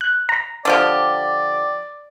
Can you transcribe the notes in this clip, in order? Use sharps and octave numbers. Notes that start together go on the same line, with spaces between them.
F#6
A#5
D3 F3 G4 D5